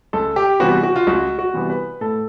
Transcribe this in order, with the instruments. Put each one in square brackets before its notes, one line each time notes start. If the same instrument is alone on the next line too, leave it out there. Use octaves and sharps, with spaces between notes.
[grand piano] C#2 A4
G4
C3 E3 G3 B3 F#4
F#4
F4
C#2 F#4
F#4
C3 E3 G3 B3
B4
A2 A4